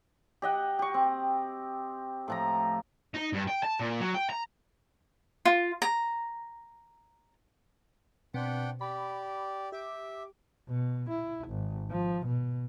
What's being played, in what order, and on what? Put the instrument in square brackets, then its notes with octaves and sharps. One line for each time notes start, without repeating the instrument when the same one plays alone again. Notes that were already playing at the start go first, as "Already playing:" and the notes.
[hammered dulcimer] G4 D#5 F#5
G4 C#6
C4
A2 F3 A#5
[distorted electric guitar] D#4
G2
G5
A5
A#2
F#3
G5
A#5
[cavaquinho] F4
A#5
[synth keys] B2 C4 [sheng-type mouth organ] D4 F#5 G5
[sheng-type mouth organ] G4 D5 [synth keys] B5
[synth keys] G4 D6 [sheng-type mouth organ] E5
[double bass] B2
E4
G#1
F3
B2